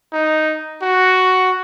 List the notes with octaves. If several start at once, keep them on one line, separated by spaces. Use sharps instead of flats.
D#4
F#4